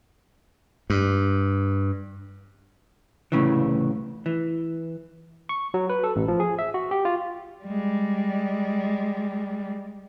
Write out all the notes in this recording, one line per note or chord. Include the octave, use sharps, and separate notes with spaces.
G2
C2 A2 C#3 E3
E3
C#6
F#3
B4
A4
A1
F3
G#4
E5
F#4
G4
F4
G3 G#3